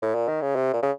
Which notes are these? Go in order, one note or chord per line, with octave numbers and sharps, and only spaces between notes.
A2
A#2
D#3
C#3
C3
A#2
C#3